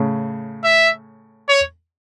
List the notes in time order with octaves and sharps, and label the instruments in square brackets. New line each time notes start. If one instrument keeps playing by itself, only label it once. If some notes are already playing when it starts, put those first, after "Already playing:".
Already playing: [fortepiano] A2 C#3
[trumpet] E5
C#5